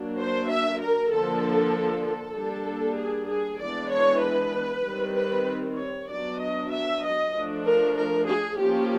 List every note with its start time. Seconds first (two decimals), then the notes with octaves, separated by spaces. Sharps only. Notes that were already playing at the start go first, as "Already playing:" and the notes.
Already playing: F#3 A#3 D4
0.18 C5
0.49 E5
0.80 A#4
1.11 D3 F3 A#3 D4 A4
2.04 A4
2.36 G3 A#3 D4
2.98 G#4
3.29 G#4
3.60 E3 G#3 B3 D4 D5
3.91 C#5
4.22 B4
4.84 D#3 G3 C4
5.15 B4
5.77 C#5
6.09 F#3 B3 D4 D5
6.40 D#5
6.71 E5
7.02 D#5
7.33 F3 A3 D4
7.64 A#4
7.95 A#4
8.26 G#4
8.57 F3 A#3 C#4 G4